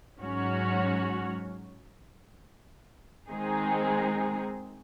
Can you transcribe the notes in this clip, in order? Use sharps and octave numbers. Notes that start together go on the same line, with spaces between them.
G#2 F#3 C#4 F#4 C#5
D#3 G#3 C4 D#4 G#4